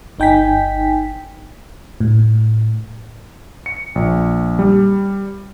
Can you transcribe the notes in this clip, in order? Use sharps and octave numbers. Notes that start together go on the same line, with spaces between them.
G1 D#4 G5 G#5 B6
A2
C#7
A#1
G3